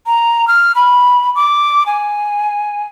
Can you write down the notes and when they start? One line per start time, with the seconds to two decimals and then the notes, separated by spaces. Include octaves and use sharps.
0.06 A#5
0.48 F6
0.75 B5
1.35 D6
1.87 G#5